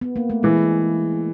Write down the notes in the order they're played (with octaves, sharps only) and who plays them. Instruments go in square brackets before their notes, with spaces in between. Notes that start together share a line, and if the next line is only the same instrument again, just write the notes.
[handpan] B3
A#3
A3
[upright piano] E3 [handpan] G#3